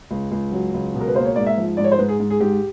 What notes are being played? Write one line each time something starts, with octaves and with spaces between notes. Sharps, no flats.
C#2
C#2
F#3
C#2
B2
A#4
B4
A#3 C5
C#5
G#2 D5
E5
F3
G#2 D5
C#5
C5
G#2 B4
G#4
G#2
G#4
G#2 G4